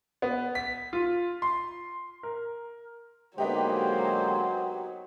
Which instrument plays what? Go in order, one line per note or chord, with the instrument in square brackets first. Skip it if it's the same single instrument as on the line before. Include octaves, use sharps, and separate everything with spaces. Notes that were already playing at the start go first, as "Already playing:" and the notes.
[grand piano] B3
B6
F4
C6
A#4
[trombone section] D3 G#3 A#3 [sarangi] F#3 [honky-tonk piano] B3 D#4 G4 [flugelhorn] C5